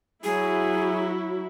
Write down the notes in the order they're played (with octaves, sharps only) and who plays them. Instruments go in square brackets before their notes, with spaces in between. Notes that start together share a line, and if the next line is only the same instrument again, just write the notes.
[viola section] F#3 E4 [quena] G#4